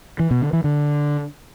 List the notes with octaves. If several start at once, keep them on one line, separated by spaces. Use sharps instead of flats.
E3
B2
D3
E3
D3